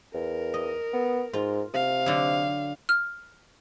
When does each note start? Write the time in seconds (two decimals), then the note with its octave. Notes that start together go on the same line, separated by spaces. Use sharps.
0.14 E2 A#4
0.54 D#5
0.93 B3
1.33 G#2 F4
1.74 C3 F5
2.06 D3 F#3
2.89 F6